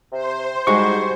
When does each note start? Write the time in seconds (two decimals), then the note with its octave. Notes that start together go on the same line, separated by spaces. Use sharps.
0.12 C3 C5
0.67 G#2 G3 G#3 F#4 C#6